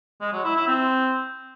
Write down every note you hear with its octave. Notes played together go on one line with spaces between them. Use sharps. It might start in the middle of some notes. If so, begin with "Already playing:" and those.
G#3
F#3
E4
E4
C4